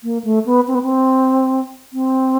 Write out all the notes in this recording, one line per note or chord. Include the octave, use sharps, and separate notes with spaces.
A#3
A3
B3
C4
B3
C4
C4